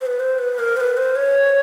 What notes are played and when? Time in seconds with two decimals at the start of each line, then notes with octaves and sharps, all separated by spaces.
0.01 C5
0.06 B4
0.20 C5
0.39 B4
0.59 A#4
0.77 C5
0.80 B4
0.97 C5
1.16 C#5